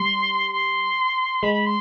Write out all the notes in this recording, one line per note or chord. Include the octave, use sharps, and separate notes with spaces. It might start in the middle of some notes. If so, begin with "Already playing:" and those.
Already playing: G3 C6
C6
G#3 B5
C6